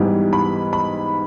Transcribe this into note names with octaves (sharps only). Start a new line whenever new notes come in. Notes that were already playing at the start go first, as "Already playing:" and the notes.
Already playing: G#2 E3 G3 B3
B5
B5